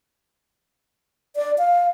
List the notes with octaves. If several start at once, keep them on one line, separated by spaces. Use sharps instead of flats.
D5
F5